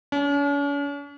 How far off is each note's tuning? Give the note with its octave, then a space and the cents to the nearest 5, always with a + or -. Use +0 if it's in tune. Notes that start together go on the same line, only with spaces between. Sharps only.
C#4 +45